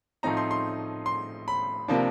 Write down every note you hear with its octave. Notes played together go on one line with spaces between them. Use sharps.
A2 F3 A3 C4 D#4 A#5
C6
C6
C6
B5
C3 F3 A#3 D4